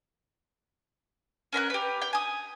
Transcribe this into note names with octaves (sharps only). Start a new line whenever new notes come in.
C#4 A#4 B5 F#6
G4 B4
G5
G#5 D#6